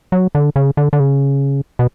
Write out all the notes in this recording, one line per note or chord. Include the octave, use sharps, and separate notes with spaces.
F#3
D3
C#3
D3
D3
C#3
B2